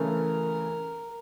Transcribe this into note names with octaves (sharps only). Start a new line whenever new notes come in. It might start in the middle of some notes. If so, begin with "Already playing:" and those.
Already playing: C#3 E3 A3 A#4